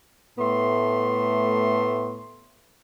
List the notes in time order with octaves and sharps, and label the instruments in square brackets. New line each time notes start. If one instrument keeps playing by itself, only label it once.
[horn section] A2 A3 B3 C6